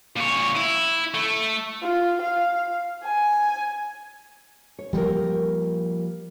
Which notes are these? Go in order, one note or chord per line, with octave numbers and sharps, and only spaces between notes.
A#2 C#5
E4
A3
F4
F5
G#5
C#5
F3 G3 A#3 G4 A#4